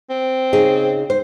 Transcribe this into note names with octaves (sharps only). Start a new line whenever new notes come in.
C4
C#3 D#4 G#4
C5